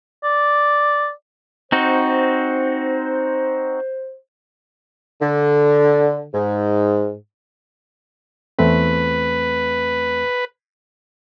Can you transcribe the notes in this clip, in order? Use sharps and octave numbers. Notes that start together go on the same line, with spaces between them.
D5
C4 D#4 F#4 C5
D3
G#2
E2 A3 C4 B4